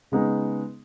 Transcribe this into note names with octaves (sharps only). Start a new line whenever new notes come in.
C#3 G#3 B3 D#4 G#4